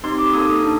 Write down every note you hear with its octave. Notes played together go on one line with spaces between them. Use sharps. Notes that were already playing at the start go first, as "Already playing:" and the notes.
C4 D#4 G4 C6
D6
A#3 D#4 A4 D#6
D4